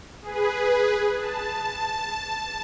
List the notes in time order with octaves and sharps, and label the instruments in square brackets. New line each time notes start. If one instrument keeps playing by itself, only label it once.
[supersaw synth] G#4 B4
A5